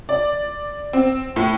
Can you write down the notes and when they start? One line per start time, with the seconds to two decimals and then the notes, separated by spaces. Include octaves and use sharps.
0.09 D5
0.93 C4
1.36 A2